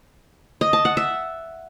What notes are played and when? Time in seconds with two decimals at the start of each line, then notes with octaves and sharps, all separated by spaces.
0.61 D#5
0.73 A5
0.85 F#5
0.97 E5